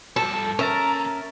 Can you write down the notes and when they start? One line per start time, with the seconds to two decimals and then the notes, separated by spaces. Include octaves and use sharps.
0.16 G2 F3 A4
0.59 D#2 C#4 A#4 E5 A5 A#5